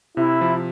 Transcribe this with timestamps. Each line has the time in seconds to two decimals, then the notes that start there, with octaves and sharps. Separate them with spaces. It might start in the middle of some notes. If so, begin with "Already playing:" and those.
0.17 C3 E4
0.41 F3